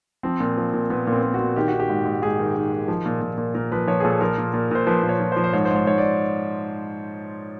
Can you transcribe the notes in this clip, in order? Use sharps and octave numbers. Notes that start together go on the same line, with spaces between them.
F3 C4
A#2
F3
A#2
A#2 B3
A#2
C4
A#2
F#4
A#2
D#3 G4
F#4
D#3
G4
G#2
G#2
G#2 G#4
D#3
D#3
D#3
F3
A#2
A#2
A#2
A#2 A#4
F3 B4
F3 C#5
G#4
A#2 A4
F3 A#4
A#2
A#2
A#2 C5
F3 B4
A#2
C#5
F3
C5
F3
C5
G#2 C#5
C5
G#2
C#5
G#2 C#5
D5